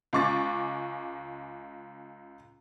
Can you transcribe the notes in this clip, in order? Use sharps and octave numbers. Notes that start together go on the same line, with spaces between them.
C#2 G#3 C#6 D6 A6